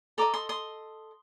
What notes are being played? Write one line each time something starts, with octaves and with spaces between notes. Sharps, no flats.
A4 D#5 A#5 D6
C6 D#6
C6 D#6